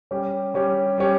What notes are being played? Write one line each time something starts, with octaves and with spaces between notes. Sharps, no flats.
G3 C#4 G4
G3 C#4 G4
G3 C#4 G4